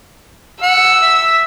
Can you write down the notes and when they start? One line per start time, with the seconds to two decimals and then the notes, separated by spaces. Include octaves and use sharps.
0.62 F#5 E6
1.02 E5